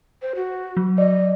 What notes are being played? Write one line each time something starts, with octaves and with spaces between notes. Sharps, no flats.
C5
F#4
F#3
D5 D#5